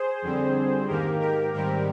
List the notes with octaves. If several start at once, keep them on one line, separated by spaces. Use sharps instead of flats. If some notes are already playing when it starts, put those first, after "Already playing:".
Already playing: G#4 C5
F2 D3 G3 C4
G#2 D#3 A#3 G4 A#4
G4 A#4
G#2 D#3 G3 C4 G4 A#4